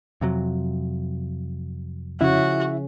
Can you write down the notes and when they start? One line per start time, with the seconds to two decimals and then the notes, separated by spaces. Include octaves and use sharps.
0.21 F2 C3 F#3
2.21 C#3 F3 C#4 E4 F#4 E5